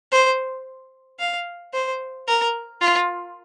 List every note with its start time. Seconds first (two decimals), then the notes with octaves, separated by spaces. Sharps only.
0.12 C5
1.19 F5
1.73 C5
2.28 A#4
2.81 F4